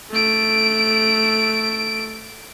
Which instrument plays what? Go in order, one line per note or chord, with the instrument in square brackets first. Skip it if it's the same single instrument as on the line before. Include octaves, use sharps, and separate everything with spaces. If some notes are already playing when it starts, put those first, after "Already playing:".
[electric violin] A3 D7